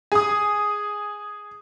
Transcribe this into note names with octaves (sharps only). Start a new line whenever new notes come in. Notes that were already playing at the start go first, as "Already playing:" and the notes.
G#4 D#6